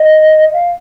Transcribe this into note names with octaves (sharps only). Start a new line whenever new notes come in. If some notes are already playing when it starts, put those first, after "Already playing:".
Already playing: D#5
F5